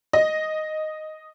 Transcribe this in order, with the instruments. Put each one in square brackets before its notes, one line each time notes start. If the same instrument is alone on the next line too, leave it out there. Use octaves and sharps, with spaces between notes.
[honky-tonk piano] D#5